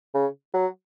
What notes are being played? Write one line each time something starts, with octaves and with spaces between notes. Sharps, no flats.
C#3
F#3